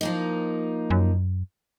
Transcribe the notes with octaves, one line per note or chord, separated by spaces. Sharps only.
F3 A#3 D#4
F#2